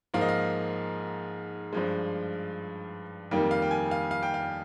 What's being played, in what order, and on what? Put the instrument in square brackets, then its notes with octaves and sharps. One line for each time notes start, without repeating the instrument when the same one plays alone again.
[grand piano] G#2 F3 A#3 F5
D#5
F5
G2 F3 G#3
F2 D#3 G3 A#3 G5
F5
G5
G#5
F5
F5
G5
F5